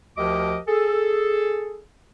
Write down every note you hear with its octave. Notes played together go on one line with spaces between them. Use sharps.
D2 F3 G4 A#4 D#5 D6
G#4 A4